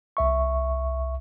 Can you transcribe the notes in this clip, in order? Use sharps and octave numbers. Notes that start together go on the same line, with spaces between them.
C2 E5 C#6